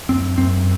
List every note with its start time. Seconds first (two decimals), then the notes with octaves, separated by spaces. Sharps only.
0.09 F#2 C4
0.38 F#2 C4